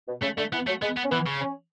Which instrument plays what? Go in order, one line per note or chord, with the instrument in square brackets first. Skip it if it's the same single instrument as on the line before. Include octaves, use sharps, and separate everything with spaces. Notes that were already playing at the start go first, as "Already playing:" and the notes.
[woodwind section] B2
[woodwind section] C#3 [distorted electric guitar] A3
[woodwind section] D3 [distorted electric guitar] A3
[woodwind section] E3 [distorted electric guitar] B3
[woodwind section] F#3 [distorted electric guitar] A3
[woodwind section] G#3 [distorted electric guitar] B3
[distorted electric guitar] B3
[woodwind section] C#4
[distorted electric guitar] E3 [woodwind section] B3
[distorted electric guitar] C#3
[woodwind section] C#4